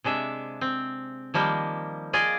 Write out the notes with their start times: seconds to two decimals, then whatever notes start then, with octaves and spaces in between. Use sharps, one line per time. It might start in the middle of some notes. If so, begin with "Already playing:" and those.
0.04 C3 G#3 D4 E5
0.61 C4
1.34 D#3 F3 G3 A#3
2.13 F4 G#4 D5 D#5